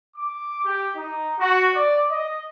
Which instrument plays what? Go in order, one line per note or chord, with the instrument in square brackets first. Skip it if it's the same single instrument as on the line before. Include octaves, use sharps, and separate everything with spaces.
[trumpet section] D6
G4
D#4
F#4
D5
D#5